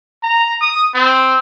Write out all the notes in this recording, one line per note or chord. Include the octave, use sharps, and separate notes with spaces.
A#5
D#6
C4